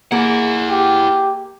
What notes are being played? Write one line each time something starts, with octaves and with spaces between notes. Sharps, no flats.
A#3 E4 G#4 F#5
G4